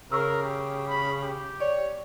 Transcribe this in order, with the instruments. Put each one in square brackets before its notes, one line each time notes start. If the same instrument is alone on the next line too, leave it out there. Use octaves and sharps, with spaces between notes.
[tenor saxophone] C#3 [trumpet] A#4 [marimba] C#6 E6
[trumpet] G4
B5
G4
[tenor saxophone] C#5 [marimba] D5